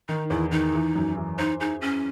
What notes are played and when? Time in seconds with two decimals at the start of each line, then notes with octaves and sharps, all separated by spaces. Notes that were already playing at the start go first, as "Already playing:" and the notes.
0.09 D#3 D#4
0.30 E2 E4
0.51 D#3 D#4
0.74 E3
0.96 F#2
1.17 E3
1.38 D#4 C5
1.60 D#4 G#4
1.81 C#4 G#4